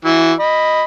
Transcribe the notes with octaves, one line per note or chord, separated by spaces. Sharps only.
E3 E4 F#4
D#5 B5